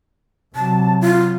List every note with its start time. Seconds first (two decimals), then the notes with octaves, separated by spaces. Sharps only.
0.55 C3 F#3 A5
1.01 F4